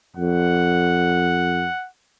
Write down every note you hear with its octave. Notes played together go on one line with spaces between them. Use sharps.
F2 F#5